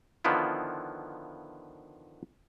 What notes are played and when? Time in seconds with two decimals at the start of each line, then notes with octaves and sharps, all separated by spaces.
0.24 D3 D#3 F3 B3 E4 F4